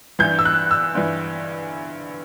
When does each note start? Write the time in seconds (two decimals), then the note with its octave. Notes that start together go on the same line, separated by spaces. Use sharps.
0.19 G2 E3 G6
0.39 E6
0.45 F#6
0.71 E6
0.95 G2 E3